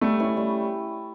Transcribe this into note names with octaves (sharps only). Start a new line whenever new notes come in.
G3 A3
C#4 E4
G3